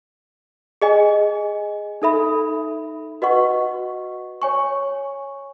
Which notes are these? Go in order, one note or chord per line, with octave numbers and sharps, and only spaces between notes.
G#4 D#5 G#5
D#4 A4 E5 B5
F#4 B4 D#5 F#5 C#6
C#5 G#5 C#6